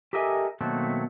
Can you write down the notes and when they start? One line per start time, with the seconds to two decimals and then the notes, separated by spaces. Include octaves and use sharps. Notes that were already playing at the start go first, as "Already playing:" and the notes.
0.13 G4 A4 A#4 D#5 E5 G#5
0.61 B2 D#3 F#3 A3 A#3 C4